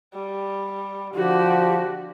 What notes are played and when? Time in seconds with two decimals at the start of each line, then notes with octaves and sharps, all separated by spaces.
0.14 G3
1.15 D3 F3 F#4 G4